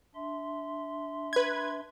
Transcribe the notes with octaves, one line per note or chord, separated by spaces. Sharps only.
D4 E5 C6
B4 G#6